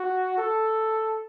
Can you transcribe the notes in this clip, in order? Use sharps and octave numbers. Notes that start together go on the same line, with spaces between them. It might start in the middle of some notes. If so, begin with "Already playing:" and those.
Already playing: F#4
A4